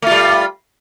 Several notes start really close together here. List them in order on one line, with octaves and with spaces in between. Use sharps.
A3 F4 G3